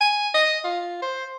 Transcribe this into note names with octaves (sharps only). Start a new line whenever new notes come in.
G#5
D#5
F4
C5